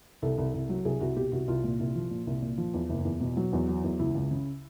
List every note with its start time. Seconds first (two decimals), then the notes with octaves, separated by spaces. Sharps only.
0.22 C2 A4
0.38 C2
0.54 C2
0.69 F#3
0.85 C2 G#4
1.01 C2 F#4
1.16 B2 G4
1.32 C2 F#4
1.48 C2 F4
1.64 A#2
1.79 C2
1.95 F3
2.11 A#2
2.27 C2
2.42 A#2
2.58 F3
2.74 E2
2.89 F#1
3.05 E2
3.21 B2
3.37 F#3
3.53 E2
3.68 F#3
3.84 E2
3.99 C#2 E4
4.15 C#2
4.31 C#3